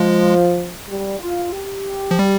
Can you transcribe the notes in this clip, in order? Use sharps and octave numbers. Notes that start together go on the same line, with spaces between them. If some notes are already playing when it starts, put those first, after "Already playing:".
Already playing: F3 G#3
G3
F4
G4
F3
G3